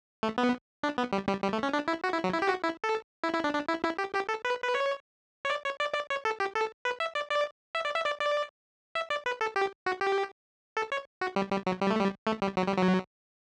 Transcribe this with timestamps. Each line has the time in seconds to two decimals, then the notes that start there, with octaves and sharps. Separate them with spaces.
0.23 A3
0.38 B3
0.83 D4
0.98 B3
1.13 G3
1.28 G3
1.43 G3
1.53 A3
1.63 C#4
1.73 D4
1.88 E4
2.04 F#4
2.13 E4
2.24 F#3
2.33 E4
2.42 G4
2.49 F#4
2.64 E4
2.84 A4
3.24 E4
3.34 E4
3.44 D4
3.54 D4
3.69 E4
3.84 E4
3.98 G4
4.14 G4
4.29 A4
4.45 B4
4.63 B4
4.75 C#5
5.45 C#5
5.50 D5
5.64 C#5
5.80 D5
5.94 D5
6.10 C#5
6.25 A4
6.40 G4
6.55 A4
6.85 B4
7.00 E5
7.15 D5
7.30 D5
7.75 E5
7.85 D5
7.95 E5
8.06 D5
8.20 D5
8.95 E5
9.10 D5
9.26 B4
9.41 A4
9.56 G4
9.86 F#4
10.01 G4
10.77 A4
10.92 C#5
11.21 F#4
11.36 G3
11.51 G3
11.67 F#3
11.81 G3
11.90 A3
11.99 G3
12.27 A3
12.42 G3
12.57 F#3
12.67 G3
12.77 F#3